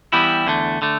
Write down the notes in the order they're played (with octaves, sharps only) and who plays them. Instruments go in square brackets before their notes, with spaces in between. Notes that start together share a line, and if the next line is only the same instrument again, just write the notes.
[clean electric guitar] E3 G3 B3 E4 G4
E2 D3 A3
D3 A3